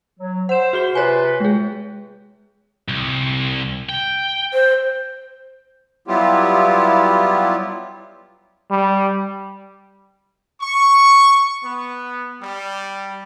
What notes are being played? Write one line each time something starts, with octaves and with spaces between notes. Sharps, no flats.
F#3
C5 F#5 E7
F#4 G#4 G7
C3 F4 B4 C#5 G#5
G#3 G#4
C2
G5
C5
F#3 G3 B3 E4 F4 G4
G3
C#6
B3
G3